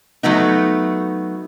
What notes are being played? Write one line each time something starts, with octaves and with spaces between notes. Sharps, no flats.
F#3 A3 B3 D#4